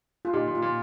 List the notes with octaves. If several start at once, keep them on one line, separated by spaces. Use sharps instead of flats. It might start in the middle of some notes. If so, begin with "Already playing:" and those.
F4
A#2 D#4 G4
A#2
F4
A#2